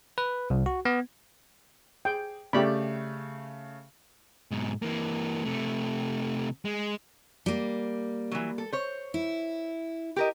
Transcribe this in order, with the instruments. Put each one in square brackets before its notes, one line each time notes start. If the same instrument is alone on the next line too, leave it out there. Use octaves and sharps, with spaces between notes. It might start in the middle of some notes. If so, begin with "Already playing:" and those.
[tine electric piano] B4
C2
F#4
B3
[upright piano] G#4 [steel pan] G5
[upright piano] C#3 A3 [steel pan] G4 D5 B5
[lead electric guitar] G#2 B2
E3 A#3
C3 A3
G#3
[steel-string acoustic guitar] G3 A#3
[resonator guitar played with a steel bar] E3 F#3
A4
C5 C#5
[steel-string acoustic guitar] E4
[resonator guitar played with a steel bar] G4 A#4 D#5